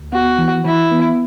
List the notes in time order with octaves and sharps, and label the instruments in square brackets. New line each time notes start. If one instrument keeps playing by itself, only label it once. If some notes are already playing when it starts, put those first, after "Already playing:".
Already playing: [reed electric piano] D2
[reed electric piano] B3 [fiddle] F#4
[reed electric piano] E3
[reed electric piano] E3 [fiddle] E4
[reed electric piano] B3